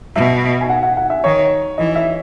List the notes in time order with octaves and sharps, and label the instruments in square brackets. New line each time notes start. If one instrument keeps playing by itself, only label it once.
[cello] B2 [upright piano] E5
[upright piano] G#5
F#5
F#5
F#5
E5
[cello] D#3 [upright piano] C#5
[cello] E3 [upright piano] D#5
[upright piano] E5